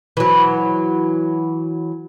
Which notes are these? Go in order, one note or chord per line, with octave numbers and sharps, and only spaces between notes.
E3 F#3